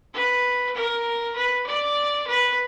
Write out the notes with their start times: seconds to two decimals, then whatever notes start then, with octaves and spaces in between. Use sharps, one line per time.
0.14 B4
0.75 A#4
1.36 B4
1.66 D5
2.27 B4